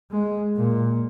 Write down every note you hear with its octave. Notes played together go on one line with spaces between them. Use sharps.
G#3
A#2